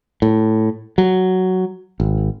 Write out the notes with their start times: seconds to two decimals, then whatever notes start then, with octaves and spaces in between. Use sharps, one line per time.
0.22 A2
0.98 F#3
2.00 G#1